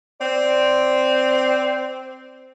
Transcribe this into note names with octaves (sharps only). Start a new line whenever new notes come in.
C4 D5